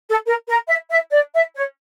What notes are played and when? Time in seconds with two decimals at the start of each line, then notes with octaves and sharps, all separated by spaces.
0.09 A4
0.26 A#4
0.48 A#4
0.68 E5
0.91 E5
1.12 D5
1.34 E5
1.55 C#5